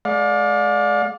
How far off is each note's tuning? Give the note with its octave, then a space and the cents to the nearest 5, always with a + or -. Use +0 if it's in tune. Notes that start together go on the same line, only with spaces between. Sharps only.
G#3 +35 D5 +0 F5 +40